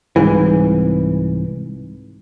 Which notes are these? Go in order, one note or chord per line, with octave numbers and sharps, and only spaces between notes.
C2 G#2 E3